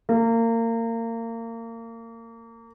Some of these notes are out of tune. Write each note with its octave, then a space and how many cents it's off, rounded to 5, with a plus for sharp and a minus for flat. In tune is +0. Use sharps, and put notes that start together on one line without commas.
A#3 -30